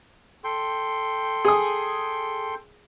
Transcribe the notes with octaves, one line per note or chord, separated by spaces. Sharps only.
A4 G5 C6
G#4 G#5 D#6